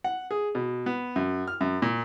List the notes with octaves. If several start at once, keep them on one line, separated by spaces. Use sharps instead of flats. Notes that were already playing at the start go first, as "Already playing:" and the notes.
F#5
G#4
B2
B3
F#2
F6
F#2
A#2